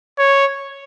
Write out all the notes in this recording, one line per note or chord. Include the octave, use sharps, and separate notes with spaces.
C#5